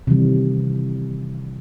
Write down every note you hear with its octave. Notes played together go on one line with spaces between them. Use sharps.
C3 D#3 E3 G3